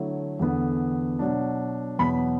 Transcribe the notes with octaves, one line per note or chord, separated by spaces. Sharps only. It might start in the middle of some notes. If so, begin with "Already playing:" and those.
Already playing: D3 F#3 A3 E4
E2 D3 B3
B2 F#3 D4
E2 B2 F#3 B3 B5